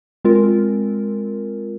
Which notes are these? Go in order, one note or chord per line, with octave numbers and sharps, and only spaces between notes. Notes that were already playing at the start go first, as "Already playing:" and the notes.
G#3 C4 F4 A#4